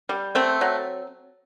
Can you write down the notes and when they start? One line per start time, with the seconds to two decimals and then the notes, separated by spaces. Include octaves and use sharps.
0.09 G3
0.35 A3 C4
0.61 F#3